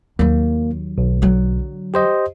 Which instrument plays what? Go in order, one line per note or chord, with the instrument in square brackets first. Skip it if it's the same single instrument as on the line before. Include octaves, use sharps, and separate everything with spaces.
[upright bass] D#2 F#3 [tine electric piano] A#3
[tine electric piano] B1
[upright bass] D3 F#3
[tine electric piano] G4 C5 D#5